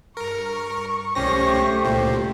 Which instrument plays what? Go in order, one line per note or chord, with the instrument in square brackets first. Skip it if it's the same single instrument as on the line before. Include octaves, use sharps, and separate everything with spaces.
[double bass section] G2 [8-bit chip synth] A#4 [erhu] C#6
[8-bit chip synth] C2 C#4 A#6 [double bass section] A3 [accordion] G4 C5
[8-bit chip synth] C#2 A#2